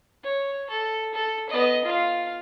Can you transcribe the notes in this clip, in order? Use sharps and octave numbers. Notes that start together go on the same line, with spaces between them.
C#5
A4
A4
B3 D#5
F4 F5